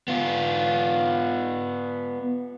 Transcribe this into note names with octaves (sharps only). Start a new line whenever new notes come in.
B3 F4